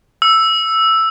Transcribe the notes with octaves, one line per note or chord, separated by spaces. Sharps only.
E6